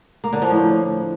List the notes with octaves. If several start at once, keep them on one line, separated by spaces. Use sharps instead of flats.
A#3
D3
F3
A2